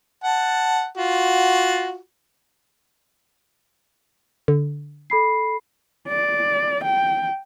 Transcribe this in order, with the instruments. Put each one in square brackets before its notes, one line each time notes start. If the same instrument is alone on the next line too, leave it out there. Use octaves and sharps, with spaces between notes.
[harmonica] F#5 A5
F4 F#4
[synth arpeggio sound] D3
[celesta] A4 B5 C7
[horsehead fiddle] D5
G5